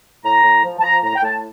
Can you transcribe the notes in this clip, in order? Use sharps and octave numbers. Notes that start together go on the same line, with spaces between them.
A2 A#5
A2
F3
A5
F3 A#5
A2 A#5
G5
A2 A5